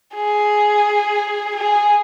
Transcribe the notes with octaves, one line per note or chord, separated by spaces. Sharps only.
G#4
G#4